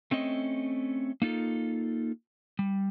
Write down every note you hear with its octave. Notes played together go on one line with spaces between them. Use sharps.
A3 C4 C#4 D#5
A#3 D#4 F4 A4
G3